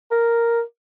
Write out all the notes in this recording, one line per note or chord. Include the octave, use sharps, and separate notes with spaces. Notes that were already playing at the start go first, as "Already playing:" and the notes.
A#4